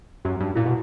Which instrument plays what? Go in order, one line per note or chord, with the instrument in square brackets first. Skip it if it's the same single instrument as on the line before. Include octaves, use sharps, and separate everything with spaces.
[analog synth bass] F#2 [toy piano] F#4
[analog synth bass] G2
[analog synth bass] A#2 [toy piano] E4
[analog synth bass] B2 [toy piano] F#4